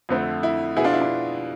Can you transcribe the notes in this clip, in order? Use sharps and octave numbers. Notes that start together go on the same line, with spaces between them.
F2 D3 A3 C4
E4
B2 B3 E4 G#4
D4 F4
E4
D4